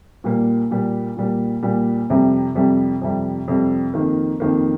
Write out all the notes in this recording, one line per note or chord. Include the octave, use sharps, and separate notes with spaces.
A#2 G3 A#3
A#2 G3 A#3
A#2 G3 A#3
A#2 G3 A#3
F2 C3 G3
F2 C3 G3
F2 C3 G3
F2 C3 G3
F2 D#3 A#3
F2 D#3 A#3